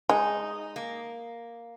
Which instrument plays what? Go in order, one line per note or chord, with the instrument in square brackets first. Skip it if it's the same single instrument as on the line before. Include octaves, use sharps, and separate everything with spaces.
[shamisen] G#3 [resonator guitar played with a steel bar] D#4
[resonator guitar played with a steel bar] A#3